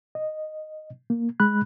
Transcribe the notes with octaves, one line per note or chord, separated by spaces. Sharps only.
D#5
A#3
G#3 B5 F#6